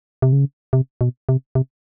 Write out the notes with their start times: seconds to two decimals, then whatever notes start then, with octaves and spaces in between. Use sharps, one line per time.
0.22 C3
0.32 C#3
0.73 C3
1.01 B2
1.29 C3
1.55 C3